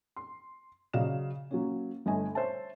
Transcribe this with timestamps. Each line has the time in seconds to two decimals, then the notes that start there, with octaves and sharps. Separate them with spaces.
0.16 C6
0.93 C#3 F#3 D5 D#5 F5 E7
1.51 F#3 A#3 C#4
2.06 G1 A3 D#5 G#5
2.35 C5 C#5 E5 A5